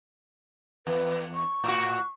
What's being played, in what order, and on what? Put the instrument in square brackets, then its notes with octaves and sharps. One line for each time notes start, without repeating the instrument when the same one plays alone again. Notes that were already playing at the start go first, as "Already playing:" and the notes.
[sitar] E2 [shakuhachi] B4
[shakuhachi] C#6
[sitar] A2 F#4